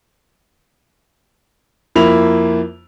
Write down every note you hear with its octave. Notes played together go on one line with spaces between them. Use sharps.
F2 F3 A#3 E4 B5 F7